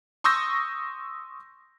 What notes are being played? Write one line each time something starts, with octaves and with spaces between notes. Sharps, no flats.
C6 C#6 D#6 E6 G6 A#6